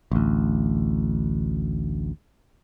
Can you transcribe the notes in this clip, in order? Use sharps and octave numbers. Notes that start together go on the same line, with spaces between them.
A1 D2